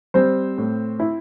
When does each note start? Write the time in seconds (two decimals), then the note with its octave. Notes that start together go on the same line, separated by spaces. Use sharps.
0.14 G3 C4 C5
0.58 A2
1.00 E4